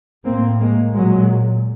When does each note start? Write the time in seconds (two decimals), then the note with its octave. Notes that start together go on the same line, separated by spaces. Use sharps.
0.25 A2 A#3 C4
0.60 G#3 A#3
0.94 A#2 F#3 G#3